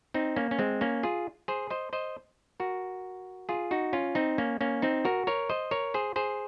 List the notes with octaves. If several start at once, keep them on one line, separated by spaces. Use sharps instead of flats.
C4 D#4
A#3 C#4
C#4
G#3 C4
A#3 C#4
F4 G#4
G#4 C5
C5 D#5
C5 D#5
F#4 A#4
F4 G#4
D#4 F#4
C#4 F4
C4 D#4
A#3 C#4
A#3 C#4
C4 D#4
F#4 A#4
A#4 C#5
C5 D#5
A#4 C#5
G#4 C5
G#4 C5